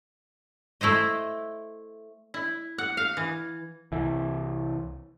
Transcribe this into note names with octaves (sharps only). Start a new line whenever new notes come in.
A3 E4 C5 D#5
E4
F#5
F5
E3
C2 E3